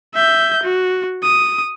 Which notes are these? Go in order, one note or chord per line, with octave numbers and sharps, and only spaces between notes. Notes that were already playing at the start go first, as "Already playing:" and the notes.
E5 G6
F#4
D#6